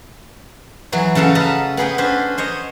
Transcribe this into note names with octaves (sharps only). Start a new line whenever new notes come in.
E3 F#3 F#4 G#4
C#3 F#4 A4 F5 A#5
A4 B4 D#5 A5 A#5
B3 G#4 B4 G5
C#4 D4 G#4 B4 C5
C5 C#5 D#5